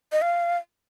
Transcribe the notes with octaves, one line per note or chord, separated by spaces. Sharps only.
D#5
F5